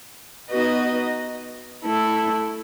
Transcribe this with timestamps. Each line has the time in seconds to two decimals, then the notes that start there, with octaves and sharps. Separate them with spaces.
0.50 B3 D#4 F#4 B4 D#5
1.84 A3 E4 A4